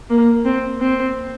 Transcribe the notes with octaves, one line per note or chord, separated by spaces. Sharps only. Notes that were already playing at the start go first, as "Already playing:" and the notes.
A#3
C4
C4